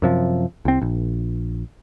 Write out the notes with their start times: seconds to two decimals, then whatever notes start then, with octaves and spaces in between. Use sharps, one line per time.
0.02 F#2 C3 F3
0.65 C2 C4
0.82 A#1